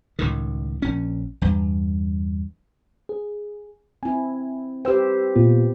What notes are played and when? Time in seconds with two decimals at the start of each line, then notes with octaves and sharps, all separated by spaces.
0.19 C#2 A2 D#3
0.82 A#1 C#4
1.41 E2 G2
3.09 G#4
4.03 C4 E4 G#5
4.85 G4 B4 C5 G5 E6
5.35 A#2 B3 F4